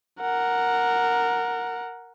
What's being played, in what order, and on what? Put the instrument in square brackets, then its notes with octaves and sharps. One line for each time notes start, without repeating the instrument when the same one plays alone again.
[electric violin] A#4 F#5